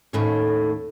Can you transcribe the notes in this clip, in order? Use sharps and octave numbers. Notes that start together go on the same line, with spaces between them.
D#2 A2 C#4